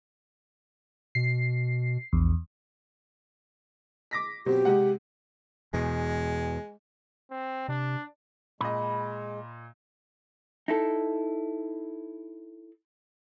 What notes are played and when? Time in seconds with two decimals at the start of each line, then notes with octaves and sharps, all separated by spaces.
1.15 B2 C7
2.13 A#1 E2
4.11 D6 A#6 B6
4.46 B2 F#3 C4 G4
4.65 C3 G#3 F#5
5.74 E2 B2 G#3
7.31 C4
7.68 C3 D4
8.61 A#2 G#3 D#5 B5
10.68 D#4 E4 A4